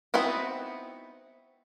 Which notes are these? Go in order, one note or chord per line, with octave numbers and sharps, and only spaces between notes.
B3 C4 D#4 E4 F#4